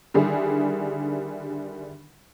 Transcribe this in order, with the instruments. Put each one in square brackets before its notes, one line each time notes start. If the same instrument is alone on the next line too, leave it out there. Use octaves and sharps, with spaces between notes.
[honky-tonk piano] D3 D#3 G3 E4 G#4